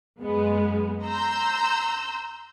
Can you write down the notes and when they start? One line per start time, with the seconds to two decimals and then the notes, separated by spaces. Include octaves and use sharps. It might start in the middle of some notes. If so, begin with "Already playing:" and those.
0.21 F#2 G#3 B3
1.04 A#5 C6 E6 G6